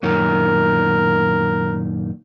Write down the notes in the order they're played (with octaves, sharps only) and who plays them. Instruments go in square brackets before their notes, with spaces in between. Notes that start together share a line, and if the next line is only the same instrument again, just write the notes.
[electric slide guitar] F#2 A#2 D#3 [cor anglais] A#4